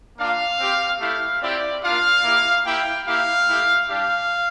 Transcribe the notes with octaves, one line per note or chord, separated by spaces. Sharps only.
A#3 D4 F4 F5
C4 G4
A3 E4 G4 F5
C4 E4 G4 D5
A#3 D4 F4 F5
A#3 E4 G4
A#3 E4 G4 G5
A#3 E4 G4 F5
A3 E4 G4
G3 D4 G4 F5